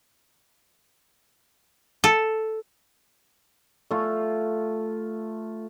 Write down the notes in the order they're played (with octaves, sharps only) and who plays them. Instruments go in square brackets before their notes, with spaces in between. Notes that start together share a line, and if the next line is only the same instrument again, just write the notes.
[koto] A4
[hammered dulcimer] A3 F4